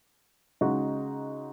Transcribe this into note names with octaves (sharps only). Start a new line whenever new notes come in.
C#3 G#3 D#4 F#4